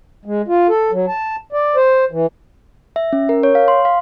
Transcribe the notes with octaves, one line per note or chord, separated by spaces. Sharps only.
G#3
F4
A4
F#3
A5
D5
C5
E3
E5
C#4
A#4
C#5
F5
C6
F5